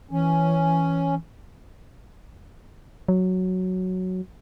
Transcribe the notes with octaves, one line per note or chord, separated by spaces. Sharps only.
E3 C#4
F#3